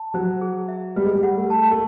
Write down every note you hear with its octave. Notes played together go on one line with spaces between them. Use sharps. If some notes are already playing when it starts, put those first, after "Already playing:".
Already playing: A5
F#3 C5
G#4
E5
G3 B4
G#3
G3
F#5
A3
A5
A3